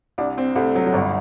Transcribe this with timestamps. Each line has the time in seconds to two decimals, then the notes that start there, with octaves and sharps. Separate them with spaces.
0.18 C2 D4
0.38 C4
0.55 C2 A3
0.75 F#3
0.86 F#3
0.93 G1 G3